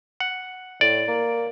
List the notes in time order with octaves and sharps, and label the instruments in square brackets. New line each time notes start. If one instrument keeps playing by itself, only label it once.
[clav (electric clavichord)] F#5
[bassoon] A2 [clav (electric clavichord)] D5
[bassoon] A#3